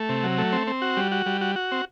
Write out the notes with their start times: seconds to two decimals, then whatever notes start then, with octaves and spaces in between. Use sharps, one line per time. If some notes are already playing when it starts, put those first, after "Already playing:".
Already playing: A3
0.09 C3
0.23 F#3
0.38 A3
0.52 C4
0.67 C4
0.82 F#4
0.97 G3
1.12 F#4
1.26 G3
1.41 F#4
1.56 F#4
1.71 C4